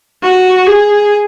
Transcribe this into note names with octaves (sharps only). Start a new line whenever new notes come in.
F#4
G#4